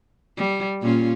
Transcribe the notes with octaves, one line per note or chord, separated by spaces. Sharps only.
G3
A#2 C#4 F4